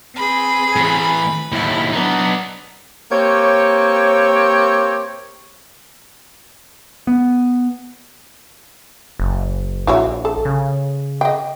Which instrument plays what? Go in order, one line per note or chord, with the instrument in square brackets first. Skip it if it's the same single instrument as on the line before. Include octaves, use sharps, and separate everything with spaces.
[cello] C4 G#4 [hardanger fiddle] B4 B5
[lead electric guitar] A2 E3
[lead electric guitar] D#2 A2 [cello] E4
[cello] F#3 [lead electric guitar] B3 D#4 [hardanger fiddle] D4
[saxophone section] A#3 C4 G4 C#5
[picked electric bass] B3
[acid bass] F#1
[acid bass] A#1 [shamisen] E4 F#4 C#5
[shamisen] A4
[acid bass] C#3
[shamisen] D#5 G5